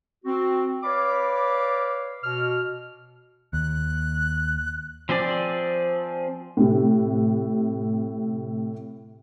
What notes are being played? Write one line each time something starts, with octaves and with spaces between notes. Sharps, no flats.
C4 F#4
B4 C#5 D5 F5 B5 D6
B2 F6
D#2 F#6
F3 C4 G#4 D5
A2 C3